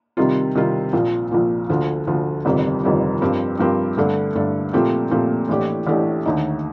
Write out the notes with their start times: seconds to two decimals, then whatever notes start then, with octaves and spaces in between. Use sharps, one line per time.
0.17 C3 D#3 G3 C4 F4
0.55 C3 D#3 G3 C4 F4
0.93 A#1 A#2 F3
1.31 A#1 A#2 F3
1.69 D2 D3 F3
2.07 D2 D3 F3
2.45 G1 F2 C3 D#3 G3
2.83 G1 F2 C3 D#3 G3
3.21 G2 F3 C4 G4 A#4
3.59 G2 F3 C4 G4 A#4
3.97 G2 D3 A3 D4 A4
4.35 G2 D3 A3 D4 A4
4.73 A#2 F3 A3 C4 G4
5.11 A#2 F3 A3 C4 G4
5.49 A1 A2 A3 D4 G4
5.87 A1 A2 A3 D4 G4
6.25 D#2 D3 A3 D#4